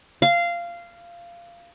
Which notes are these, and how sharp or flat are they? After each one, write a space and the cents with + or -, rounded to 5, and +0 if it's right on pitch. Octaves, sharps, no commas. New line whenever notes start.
F5 -15